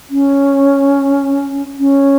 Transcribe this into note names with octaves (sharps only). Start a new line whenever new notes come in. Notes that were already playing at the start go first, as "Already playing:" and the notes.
C#4
C#4